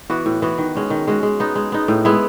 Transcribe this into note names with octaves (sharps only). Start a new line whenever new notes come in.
E3 B3 F#4
A2
E3 B3 F#4
D#3
G#3 C#4 F#4
D#3
G#3 C#4 F#4
G#3
B3 D#4
G#3
B3 D#4
A2
G#3 B3 E4